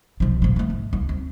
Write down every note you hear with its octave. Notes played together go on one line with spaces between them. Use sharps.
B1 F3
A#2 F3
F#3 A3
G#2
C#2
C4